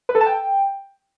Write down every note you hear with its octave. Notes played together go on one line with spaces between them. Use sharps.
B4
A4
A5
G5